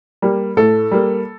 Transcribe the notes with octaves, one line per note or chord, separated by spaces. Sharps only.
G3 A#3
A2 A4
G3 A#3